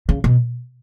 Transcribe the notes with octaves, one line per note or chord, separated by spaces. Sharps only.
C#3
B2